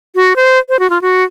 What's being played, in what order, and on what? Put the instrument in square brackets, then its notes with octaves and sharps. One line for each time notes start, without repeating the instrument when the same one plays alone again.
[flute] F#4
C5
C5
F#4
F4
F#4